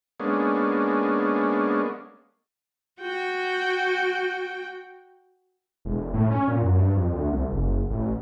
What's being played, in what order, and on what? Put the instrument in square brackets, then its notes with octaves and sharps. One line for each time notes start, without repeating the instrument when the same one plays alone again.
[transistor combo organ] G#3 A#3 B3 C#4 D4
[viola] F#4 G5
[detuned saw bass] E1
A2
C#4
A#2
F#2
G2
F2
D2
C2
F#1
A1